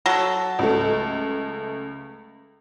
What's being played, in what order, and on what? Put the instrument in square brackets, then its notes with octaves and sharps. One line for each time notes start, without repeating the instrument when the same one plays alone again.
[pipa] F#3 A4
[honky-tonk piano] C#2 A3